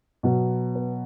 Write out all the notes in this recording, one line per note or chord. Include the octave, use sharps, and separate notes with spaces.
B2 F#3 B3
B4